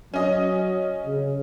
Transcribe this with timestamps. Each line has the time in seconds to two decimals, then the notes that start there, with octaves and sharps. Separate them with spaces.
0.14 F#3 C#4 D#5
1.06 C#3